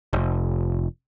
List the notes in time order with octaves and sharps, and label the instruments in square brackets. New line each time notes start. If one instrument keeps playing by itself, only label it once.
[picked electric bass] F1